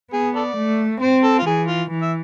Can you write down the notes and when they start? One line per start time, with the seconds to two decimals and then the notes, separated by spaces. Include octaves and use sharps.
0.13 B3 G#4
0.35 A4 D5
0.56 A3
1.02 C4 C5
1.23 A4
1.39 F4
1.46 E3 G#4
1.67 F4
1.90 E3
2.02 E5